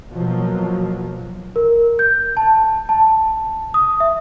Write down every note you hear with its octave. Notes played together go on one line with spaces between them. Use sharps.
B2 F3 F#3 A#3
A#4
G6
A5
A5
D#6
E5